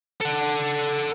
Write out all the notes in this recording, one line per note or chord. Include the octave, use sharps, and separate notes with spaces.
A4 F#5